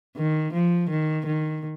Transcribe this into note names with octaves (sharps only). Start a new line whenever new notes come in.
D#3
F3
D#3
D#3